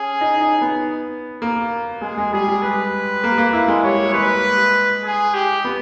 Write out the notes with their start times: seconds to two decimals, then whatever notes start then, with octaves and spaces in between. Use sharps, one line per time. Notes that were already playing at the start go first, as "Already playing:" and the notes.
Already playing: C#4 G#4
0.21 D#4
0.41 D#4
0.62 B3
1.42 A#3
2.02 G#3 G#4
2.18 G#3
2.32 G3 G#4
2.48 G3
2.63 B4
3.24 A#3
3.38 A#3
3.53 E4
3.68 G#3
3.83 G3 C#5
4.13 G#3 B4
5.05 G#4
5.34 G4
5.65 B3